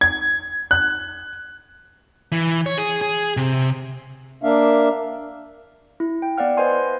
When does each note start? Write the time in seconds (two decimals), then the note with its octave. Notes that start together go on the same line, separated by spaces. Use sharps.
0.01 G#6
0.71 F#6
2.32 E3
2.66 C#5
2.78 G#4
3.02 G#4
3.37 C3
4.43 A#3 D4 E5 F5
6.00 E4
6.22 G5
6.38 B3 D5 F5 F#5 F6
6.57 B4 C5 D#5 F#5 G#5 C6